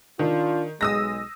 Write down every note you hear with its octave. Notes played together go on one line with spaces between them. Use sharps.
D#3 D4 F4
B1 G#3 D#6 E6 A#6